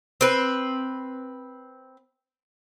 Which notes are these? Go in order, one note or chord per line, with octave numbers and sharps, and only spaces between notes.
C4 B4